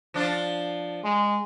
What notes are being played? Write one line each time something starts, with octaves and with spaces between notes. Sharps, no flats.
F3 D4 F4
G#3